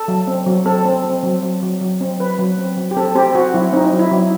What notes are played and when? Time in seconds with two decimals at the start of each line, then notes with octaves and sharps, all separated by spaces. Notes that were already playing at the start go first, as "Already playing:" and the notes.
Already playing: A4
0.08 F#3
0.27 C4
0.47 F#3
0.66 C4 A4
0.85 C4
1.04 C4
1.23 F#3
1.43 F#3
1.63 F#3
1.81 F#3
2.01 C4
2.20 F#3 B4
2.38 F#3
2.58 C4
2.77 F#3
2.91 G4
2.97 C4 A4
3.15 C4 G4
3.34 C4 F#4
3.54 F#3 E4
3.73 C4 D#4
3.93 F#3
3.99 E4
4.11 F#3